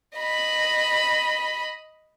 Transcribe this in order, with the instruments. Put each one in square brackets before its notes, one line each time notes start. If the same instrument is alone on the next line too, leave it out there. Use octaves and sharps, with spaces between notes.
[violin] D#5 B5